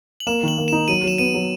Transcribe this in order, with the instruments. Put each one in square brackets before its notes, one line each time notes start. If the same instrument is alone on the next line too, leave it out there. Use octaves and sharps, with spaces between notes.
[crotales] F#7
[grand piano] A#3 [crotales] E7
[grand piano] D#3 [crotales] F#7
[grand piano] A#3
[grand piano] D#4 [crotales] E7
[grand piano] F#3 [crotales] D#7
[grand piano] F#3 [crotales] E7
[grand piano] B3 [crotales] D#7
[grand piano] F#3